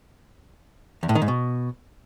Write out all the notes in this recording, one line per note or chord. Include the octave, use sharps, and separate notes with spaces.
E2
A2
D#3
G#2
B2